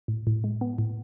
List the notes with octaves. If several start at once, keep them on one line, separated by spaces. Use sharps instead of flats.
A2
A2
G#3
B3
A2